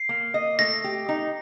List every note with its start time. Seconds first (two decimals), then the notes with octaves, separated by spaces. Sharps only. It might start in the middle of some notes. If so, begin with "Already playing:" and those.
Already playing: C7
0.09 A#3
0.34 D#5
0.59 A3 A#6
0.84 G4
1.09 D#4